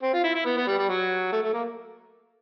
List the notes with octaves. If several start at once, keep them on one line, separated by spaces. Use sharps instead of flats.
C4
F4
E4
E4
B3
B3
G3
G3
F#3
A3
A3
A#3